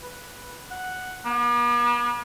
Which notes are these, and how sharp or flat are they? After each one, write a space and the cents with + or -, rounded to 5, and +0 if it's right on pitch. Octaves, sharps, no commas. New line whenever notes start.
B4 -5
F#5 +0
B3 -45